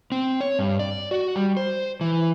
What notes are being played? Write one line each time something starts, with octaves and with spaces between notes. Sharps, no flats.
C4
C#5
G2
D5
F#4
G3
C5
E3